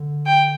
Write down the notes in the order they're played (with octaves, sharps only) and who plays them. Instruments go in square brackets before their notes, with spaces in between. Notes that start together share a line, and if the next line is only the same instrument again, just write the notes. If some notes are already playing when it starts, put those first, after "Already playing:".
Already playing: [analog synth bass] D3
[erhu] G5